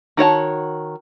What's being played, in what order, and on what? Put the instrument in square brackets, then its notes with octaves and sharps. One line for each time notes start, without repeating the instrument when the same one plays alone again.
[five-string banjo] D#3 F#4 C#5 A5